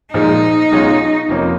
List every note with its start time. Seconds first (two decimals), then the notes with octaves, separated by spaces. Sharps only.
0.13 A#2 F3 G#3 D#4
0.71 B1 B2 G#3 C#4 F4
1.29 F1 F2 F3 A#3 C#4